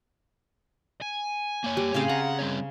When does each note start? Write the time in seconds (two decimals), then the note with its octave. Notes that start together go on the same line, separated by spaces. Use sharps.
1.01 G#5
1.64 A#3 C#5
1.77 G3
1.94 A2 C#3 C4 F5
2.09 F#5 A#5
2.39 G3 C4 C#5